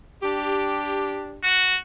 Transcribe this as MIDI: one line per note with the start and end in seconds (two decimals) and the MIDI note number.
0.22 1.43 62
0.22 1.43 67
1.43 1.78 66